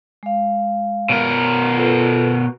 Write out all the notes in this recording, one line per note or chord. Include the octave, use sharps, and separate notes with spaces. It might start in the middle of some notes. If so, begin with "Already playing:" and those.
G#3 F5
B2 A#4
F4 A4 B4